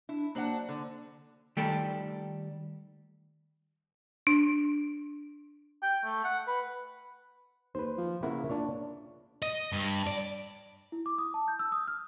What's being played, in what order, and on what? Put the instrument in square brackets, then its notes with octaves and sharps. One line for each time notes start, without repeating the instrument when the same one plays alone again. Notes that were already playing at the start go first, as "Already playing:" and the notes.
[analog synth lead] D4 [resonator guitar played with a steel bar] E4
[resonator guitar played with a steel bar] F#3 D4 F#5 [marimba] A#3 [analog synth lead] C5
[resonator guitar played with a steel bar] D3
[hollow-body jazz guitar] D#3 G3 A3 A4 G5
[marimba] D4
[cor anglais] G5
A3
F#5
B4
[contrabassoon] D#2 [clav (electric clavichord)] B4 C5
[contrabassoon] F3
[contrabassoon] C#3 [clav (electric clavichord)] A#3 E4 F#5
[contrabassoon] A#2 [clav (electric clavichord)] D4 C#5
[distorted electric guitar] D#5
G2
D5
[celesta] E4
D6
D#6
A5
G6
E6
D#6
F6